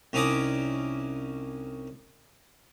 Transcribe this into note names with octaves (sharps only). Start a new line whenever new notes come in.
C2 C#4 D#4 D5 D6 D#6